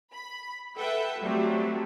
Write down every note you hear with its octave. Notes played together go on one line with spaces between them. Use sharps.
B5
A4 B4 E5 F#5 G5
F#3 G3 A3 C4